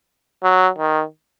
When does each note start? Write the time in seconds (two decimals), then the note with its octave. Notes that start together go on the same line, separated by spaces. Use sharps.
0.43 F#3
0.78 D#3